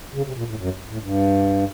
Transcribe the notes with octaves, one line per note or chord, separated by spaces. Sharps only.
C#3
C3
A#2
A2
F#2
A2
G2